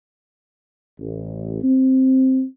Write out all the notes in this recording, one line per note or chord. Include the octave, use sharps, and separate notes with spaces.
A1
C4